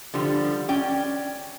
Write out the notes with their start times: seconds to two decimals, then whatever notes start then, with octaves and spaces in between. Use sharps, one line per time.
0.14 D3 F3 G3
0.68 C#4 D5 G5